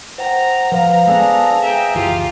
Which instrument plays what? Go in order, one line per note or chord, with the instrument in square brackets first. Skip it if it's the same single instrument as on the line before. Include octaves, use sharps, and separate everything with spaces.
[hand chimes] C5 F#5 G5 [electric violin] A#5
[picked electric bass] F3 [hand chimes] B4 C5 F5
[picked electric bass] G#3 B3 [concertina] D4 G#4 A4
[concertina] G#4 A#5 [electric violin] E5 G5
[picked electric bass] F#1 C#2 E3 [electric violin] F4 G4